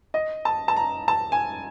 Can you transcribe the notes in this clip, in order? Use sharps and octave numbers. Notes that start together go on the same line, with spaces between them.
D#5
A5
A5
A#5
A5
G#5